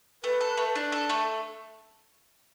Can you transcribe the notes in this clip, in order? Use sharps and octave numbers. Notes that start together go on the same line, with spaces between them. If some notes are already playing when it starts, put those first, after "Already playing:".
A3 B4
A4
A3
D4
A4
A3